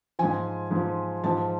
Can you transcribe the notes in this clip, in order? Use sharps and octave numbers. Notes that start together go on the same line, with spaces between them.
G#2 F3 G#5
G#2 F3
G#2 F3 A5